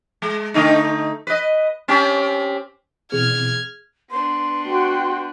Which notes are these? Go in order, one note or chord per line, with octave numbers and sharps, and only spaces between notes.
G#3
D3 A3 D#4
B4 D#5
C4 C#4 G4
B2 E3 C4 G#4 F6 G#6 F7
B3 D4 C6
F#4 G5